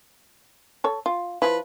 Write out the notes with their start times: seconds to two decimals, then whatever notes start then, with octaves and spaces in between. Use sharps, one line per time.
0.84 A4 C#5
1.06 F4
1.42 F3 E4 B4